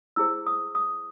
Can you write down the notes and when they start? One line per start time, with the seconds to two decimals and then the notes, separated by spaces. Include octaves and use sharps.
0.16 E4 G#4 C5 E6
0.46 D#6
0.75 D#6